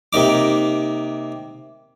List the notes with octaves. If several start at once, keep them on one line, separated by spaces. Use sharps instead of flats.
C3 A#3 D#4 D6